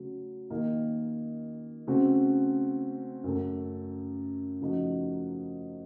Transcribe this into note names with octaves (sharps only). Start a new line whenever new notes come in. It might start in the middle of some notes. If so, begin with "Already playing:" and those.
Already playing: C#3 F#3 A3
D#3 A#3 D#4
C#3 A3 C4 F#4
F#2 C#3 A3
C#3 F3 A3 D#4 F#4